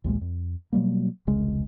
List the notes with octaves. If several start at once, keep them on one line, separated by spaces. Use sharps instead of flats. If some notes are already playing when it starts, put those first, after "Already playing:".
A#1 D#2 A#2 G#3
F2
B2 F#3 G3 A#3
E1 C2 C#3 G#3